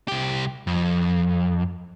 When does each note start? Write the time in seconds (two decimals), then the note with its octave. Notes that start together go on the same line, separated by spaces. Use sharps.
0.08 C2 G4
0.67 F2